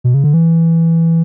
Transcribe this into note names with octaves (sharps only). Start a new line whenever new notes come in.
B2
C#3
D3
E3